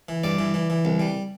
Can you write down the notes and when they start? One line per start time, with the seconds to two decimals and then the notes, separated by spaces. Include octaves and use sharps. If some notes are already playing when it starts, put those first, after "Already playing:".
0.09 E3
0.24 G2 D5
0.39 E3
0.54 E3
0.70 E3
0.85 C2
1.00 G3